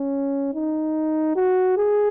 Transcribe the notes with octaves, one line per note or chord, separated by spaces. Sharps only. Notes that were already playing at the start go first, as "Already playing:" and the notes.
Already playing: C#4
D#4
F#4
G#4